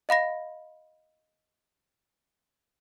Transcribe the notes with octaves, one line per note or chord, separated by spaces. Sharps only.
D#5 F5 B5 A#6